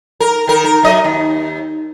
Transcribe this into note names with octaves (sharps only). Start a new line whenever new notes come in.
A#4
D#3 A#4
A#4
F#2 D#5
D#2